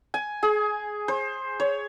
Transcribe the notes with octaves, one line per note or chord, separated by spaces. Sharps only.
G#5
G#4
C5
C#5